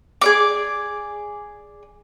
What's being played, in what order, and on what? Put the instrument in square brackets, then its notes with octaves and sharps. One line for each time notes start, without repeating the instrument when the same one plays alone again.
[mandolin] G#4 D5 D6